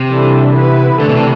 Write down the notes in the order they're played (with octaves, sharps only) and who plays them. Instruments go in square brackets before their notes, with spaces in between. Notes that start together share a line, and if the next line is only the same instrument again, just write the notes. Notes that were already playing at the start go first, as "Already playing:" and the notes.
Already playing: [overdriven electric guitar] C3
[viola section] E3 G3 D4 A4
B3 E4 B4
[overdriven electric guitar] D3 [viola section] E3 A3 D4 A4
[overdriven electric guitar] B2
C3